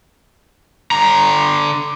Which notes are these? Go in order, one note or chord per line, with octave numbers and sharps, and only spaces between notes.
D3 A#5